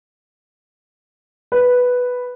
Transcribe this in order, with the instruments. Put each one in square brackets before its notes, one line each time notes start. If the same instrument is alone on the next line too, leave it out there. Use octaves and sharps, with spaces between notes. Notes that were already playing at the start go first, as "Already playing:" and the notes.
[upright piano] B4